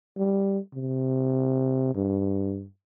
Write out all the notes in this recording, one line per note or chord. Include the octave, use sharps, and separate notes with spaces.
G3
C3
G2